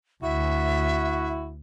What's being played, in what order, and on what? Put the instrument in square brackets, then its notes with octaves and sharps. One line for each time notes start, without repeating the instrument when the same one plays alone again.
[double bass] D2 [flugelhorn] E4 [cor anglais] F#4 [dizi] E5